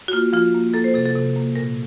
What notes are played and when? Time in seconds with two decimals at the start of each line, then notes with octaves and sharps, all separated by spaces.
0.08 F#4
0.13 A#3 F4
0.33 F3 F4
0.54 A#3
0.74 A#3 A4
0.84 C5
0.94 C3 A4
1.05 A4
1.15 C3
1.36 A#3
1.56 A#2 A#4